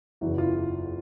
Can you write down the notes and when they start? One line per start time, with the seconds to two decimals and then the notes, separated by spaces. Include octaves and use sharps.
0.21 F#1 E2 C#3 E3 E4 F#4
0.38 F4